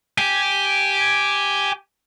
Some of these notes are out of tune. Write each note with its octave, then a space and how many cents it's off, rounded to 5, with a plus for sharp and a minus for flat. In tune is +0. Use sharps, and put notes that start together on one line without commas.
G4 +0 G#5 +0